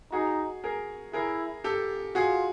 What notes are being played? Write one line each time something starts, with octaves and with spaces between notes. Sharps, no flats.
D#4 F#4 G#4
G#4 A#4
E4 G#4 A#4
G4 A4
F4 F#4 G#4